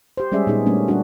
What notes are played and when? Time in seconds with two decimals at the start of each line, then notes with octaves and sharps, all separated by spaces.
0.17 G4 C5
0.32 G3 G#3 C#4 G#4 D5 E5
0.47 A#2 B3 D#4 G#4
0.66 G3 A3 A#3 C#4 D4
0.88 G3 C#4 D4 F#4